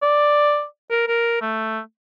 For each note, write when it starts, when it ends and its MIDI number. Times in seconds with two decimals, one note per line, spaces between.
0.02 0.64 74
0.91 1.07 70
1.08 1.40 70
1.41 1.79 57